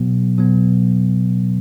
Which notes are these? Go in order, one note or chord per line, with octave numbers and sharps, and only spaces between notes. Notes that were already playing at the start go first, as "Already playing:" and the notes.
Already playing: B2 F#3 B3
B2 F#3 B3